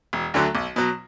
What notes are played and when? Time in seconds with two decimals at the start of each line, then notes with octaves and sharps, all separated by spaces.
0.13 E1
0.34 D2 D3 F#3 A3
0.55 B1
0.76 B2 F#3